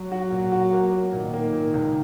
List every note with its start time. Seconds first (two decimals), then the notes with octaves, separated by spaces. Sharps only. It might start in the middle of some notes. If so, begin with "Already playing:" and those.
Already playing: F#3
0.12 F#4
0.31 A#2
0.52 F#4
0.73 A#3
0.92 A#3
1.13 A#2 D#3
1.34 A#3
1.53 A#2
1.74 C#2